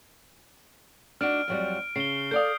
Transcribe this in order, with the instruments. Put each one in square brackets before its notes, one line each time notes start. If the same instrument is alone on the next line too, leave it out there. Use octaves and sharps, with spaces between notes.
[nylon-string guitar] D4 D#4 F#4 [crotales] F6 D7
[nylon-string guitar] F2 F#3 G3
[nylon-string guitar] C#3 [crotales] C7 G7
[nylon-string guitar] A4 D5 F5 [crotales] D#6 G6